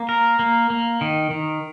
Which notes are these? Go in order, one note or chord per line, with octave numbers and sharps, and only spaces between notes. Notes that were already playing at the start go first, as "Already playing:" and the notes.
Already playing: A#3
A#4
A#3
A#3
D#3
D#3